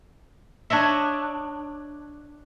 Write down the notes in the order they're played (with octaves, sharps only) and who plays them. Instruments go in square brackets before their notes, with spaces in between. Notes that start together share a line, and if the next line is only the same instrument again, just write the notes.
[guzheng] D4 C#5 D#5 E5